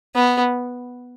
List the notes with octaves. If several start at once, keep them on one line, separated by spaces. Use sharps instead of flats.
B3